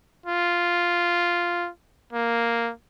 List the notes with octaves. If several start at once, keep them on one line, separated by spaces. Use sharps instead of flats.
F4
A#3